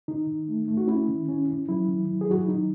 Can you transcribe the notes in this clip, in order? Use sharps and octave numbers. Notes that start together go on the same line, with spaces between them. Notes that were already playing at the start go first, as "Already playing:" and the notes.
D#3 D#4
D#3
A3
A3
F#4
C#4 E4
D#3
C#4
C#4
F#3 E4
D#3
F#3
G#4
F#3 F#4
E4
D#3 D#4